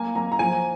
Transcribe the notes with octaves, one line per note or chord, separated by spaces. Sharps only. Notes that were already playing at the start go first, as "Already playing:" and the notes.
Already playing: A#3 G#5
A#3 A#5
A#5
F3 G#5